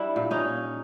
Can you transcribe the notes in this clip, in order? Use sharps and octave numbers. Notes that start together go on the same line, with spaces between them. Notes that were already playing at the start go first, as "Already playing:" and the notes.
Already playing: G3 D4 E4
A#2
C#4 D#4